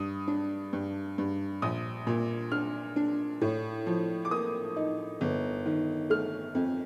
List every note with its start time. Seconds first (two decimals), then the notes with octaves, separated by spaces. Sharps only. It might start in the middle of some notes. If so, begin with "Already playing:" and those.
Already playing: G2 D#6
0.28 D4
0.73 G2
1.18 G2
1.62 A#1 D#6
2.07 A#2
2.52 D4 F6
2.96 D4
3.41 A2
3.87 F3
4.25 D6
4.31 A#3 D#6
4.76 D#4
5.21 G1
5.66 D#3
6.10 A3 F6
6.55 F2